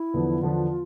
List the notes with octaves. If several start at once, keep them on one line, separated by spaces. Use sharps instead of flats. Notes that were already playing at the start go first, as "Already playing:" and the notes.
Already playing: E4
E2 D3 F3 B3
E2 D3 F3 B3 F4